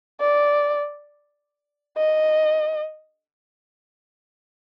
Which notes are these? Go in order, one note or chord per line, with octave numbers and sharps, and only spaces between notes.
D5
D#5